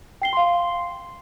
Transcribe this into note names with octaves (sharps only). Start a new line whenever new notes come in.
G5 C7 G7
F5 C6